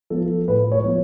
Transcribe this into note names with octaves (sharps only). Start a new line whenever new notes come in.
F3 B3 F4 A4
A2 B4
C#5
F3 B3 F4